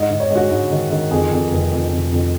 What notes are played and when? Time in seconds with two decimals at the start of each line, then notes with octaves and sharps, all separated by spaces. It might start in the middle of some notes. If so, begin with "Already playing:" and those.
Already playing: G#2 D#5
0.10 G#2
0.20 C#5
0.30 G#3
0.36 F#4
0.51 G#2
0.71 D#3
0.91 D#3
1.11 F2 G#4
1.31 F2
1.51 F1
1.72 F2
1.92 F1
2.12 F2